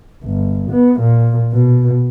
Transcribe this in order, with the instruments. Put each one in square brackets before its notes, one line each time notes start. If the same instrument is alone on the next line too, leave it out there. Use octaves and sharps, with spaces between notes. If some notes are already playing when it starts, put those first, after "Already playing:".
[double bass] G1
B3
A#2
B2